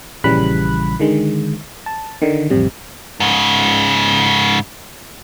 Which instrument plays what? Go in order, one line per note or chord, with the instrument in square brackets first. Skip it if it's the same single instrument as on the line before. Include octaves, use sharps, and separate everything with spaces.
[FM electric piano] A#1 C#3 E3 G3 B5 F#6
D3 D#3 G#3
A5
D3 D#3
A1 F2 C3 G3
[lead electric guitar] G#2 C#3